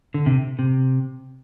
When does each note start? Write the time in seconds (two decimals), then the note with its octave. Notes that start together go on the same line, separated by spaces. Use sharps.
0.14 D3
0.26 C3
0.59 C3